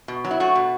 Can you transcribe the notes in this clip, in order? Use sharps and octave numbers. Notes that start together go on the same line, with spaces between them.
B2
F#3
E4
A3 F#4
B2